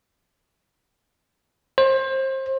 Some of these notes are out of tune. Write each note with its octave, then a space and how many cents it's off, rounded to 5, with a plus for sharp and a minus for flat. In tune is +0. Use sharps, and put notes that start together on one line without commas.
C5 +30